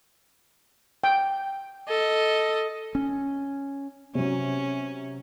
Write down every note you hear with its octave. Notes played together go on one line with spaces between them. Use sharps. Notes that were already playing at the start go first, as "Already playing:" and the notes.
G5
A4 D#5
C#4
C3 F#3 C#4